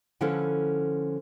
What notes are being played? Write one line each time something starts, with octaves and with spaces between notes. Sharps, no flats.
D3 F3 C#4 E4 A4 B4